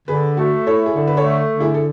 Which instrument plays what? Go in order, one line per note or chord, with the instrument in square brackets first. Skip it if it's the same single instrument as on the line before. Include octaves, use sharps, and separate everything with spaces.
[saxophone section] D3 [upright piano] G#4 B4
[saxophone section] A3 [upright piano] F#4 A4
[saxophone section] E4 [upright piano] A4 C#5
[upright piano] G#4
[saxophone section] D3 [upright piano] A4
[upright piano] B4
A4 C#5
[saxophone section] A3
D3
[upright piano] E4 G#4
A4